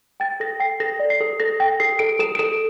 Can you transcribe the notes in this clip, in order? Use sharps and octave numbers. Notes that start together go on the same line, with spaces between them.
G5 A6
A4 A#6
G5 C7
A4 A#6
D5
C7
A4
A4 A#6
G5 A#6
A4 C7
A4 D7
A4 E7
D7
A4 E7